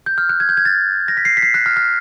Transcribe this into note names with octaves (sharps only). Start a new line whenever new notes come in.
G6
F6
F#6
G#6
G6
G#6
A6
A#6
B6
C7
B6
C7
F#6
F6
F6